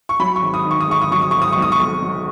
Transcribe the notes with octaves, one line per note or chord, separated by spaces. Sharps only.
C#6
F#3 B5
C#6
G#1
D#6
D#3
C#6
D#6
G#2 C#6
D#6
F#3 C#6
D#6
G#1 C#6
D#6
B1 C#6
D#6
C#6
B1
F#3